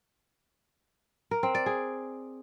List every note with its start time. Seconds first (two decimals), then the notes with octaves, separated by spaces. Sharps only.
1.31 A#4
1.43 C4
1.55 D5
1.66 G#4